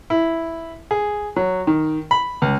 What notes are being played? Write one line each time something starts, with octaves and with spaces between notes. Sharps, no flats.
E4
G#4
F#3
D#3
B5
C#2